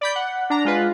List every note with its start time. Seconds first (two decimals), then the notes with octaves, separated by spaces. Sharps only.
0.01 D5 B5 G6
0.16 F#5
0.50 D4 A#5
0.65 G#3 F4 B4